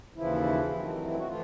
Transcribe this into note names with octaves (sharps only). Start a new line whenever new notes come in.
D#2 C#3 E3 F3 E4
G2 D#3 F#3 A3 C4
F#4
E3 F3 A3 F4